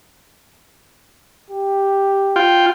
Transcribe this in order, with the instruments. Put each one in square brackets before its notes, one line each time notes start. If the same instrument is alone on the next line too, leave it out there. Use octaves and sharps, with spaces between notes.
[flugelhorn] G4
[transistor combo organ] F4 G5